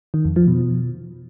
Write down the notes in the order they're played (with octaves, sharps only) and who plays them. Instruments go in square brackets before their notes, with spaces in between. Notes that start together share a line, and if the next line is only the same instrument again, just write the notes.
[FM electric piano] D#3
F2
F3
B2